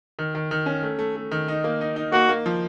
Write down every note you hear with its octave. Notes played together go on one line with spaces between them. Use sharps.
D#3
D#3
D#3
C#4
A3
A3
A3
D#3
D#4
A#3
D#4
D#4
A#3 F#4
A#3
F3